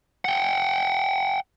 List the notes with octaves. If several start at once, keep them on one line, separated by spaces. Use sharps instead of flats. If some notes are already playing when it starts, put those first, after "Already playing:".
F#5 G5